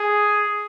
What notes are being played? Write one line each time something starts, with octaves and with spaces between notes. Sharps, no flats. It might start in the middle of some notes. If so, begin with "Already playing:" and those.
Already playing: G#4